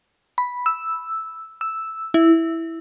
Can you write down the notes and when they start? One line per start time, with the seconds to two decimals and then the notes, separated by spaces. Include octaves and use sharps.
0.38 B5
0.66 E6
1.61 E6
2.14 E4